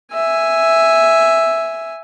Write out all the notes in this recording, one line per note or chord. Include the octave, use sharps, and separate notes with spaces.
E5 G#5